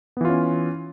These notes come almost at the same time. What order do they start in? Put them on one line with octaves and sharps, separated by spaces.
B3 E3 F4 C#4